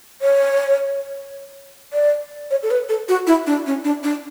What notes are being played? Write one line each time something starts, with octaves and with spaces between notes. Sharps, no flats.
C#5
D5
C#5
A4
B4
A4
F#4
E4
D4
C#4
D4
D4